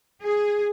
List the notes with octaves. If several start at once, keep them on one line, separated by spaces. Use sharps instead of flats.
G#4